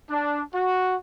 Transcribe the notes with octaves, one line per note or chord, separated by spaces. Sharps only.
D4
F#4